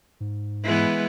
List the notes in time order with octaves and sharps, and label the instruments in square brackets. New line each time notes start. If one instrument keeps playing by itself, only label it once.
[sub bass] G#2
[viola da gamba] E3 G#3 B3